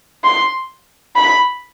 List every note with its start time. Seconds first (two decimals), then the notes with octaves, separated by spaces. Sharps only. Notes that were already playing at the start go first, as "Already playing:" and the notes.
0.24 C6
1.16 B5